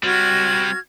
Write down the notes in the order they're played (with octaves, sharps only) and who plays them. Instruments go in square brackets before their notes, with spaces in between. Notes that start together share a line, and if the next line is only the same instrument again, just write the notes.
[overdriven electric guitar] G3 C4 [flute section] F#4 F6 G#6